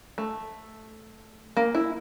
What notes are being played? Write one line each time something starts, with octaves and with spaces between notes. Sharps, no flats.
A3
A#3
E4